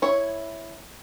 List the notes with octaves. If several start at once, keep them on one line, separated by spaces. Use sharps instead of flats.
E4 C#5